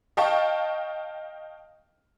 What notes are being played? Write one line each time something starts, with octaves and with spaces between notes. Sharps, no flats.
D#5 F5 G5 A5 C#6